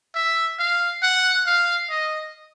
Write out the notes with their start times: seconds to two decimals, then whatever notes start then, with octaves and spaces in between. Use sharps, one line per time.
0.15 E5
0.59 F5
1.03 F#5
1.46 F5
1.90 D#5